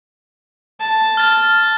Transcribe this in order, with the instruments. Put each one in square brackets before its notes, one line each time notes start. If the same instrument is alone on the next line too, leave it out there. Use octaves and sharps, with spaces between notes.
[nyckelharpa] A5
[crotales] F6 A6